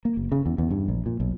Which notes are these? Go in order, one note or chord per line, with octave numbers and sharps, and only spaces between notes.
A#3
F#1
C#3
E2
E2
G2
A#1
A#2
B1